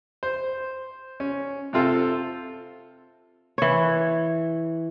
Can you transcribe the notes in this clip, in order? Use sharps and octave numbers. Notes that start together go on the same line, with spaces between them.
C5
C#4
C3 C4 F4 A4
E3 C#5